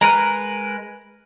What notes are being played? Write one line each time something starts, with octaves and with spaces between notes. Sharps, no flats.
G#3 A#4 B4 A#5